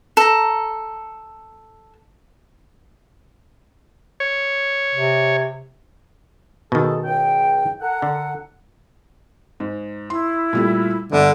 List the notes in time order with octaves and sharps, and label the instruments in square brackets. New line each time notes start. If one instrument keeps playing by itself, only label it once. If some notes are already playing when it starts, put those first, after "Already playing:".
[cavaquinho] A4 A#5
[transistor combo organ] C#5
[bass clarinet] C3
[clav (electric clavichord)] B2 D#3 [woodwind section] D#4 G#4 A4
[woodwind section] C#2 G5
A4 A#4 F#5
[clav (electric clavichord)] D3
[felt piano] G#2
[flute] E4 [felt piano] C6
[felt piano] A#2 G3 A3
[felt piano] G1 [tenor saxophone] D3